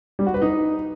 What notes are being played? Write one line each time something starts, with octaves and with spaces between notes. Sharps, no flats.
G3
F#4
B4
D#4